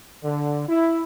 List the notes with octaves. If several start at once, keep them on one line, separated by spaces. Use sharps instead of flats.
D3
E4